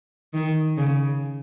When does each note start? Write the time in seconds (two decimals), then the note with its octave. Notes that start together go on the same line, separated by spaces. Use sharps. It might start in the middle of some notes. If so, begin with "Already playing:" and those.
0.34 D#3
0.77 C#3